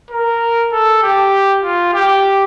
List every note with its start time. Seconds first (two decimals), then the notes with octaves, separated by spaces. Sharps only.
0.11 A#4
0.72 A4
1.02 G4
1.63 F4
1.93 G4